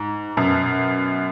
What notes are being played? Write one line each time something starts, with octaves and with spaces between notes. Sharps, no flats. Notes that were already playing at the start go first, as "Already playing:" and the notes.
Already playing: G#2
F#2 B2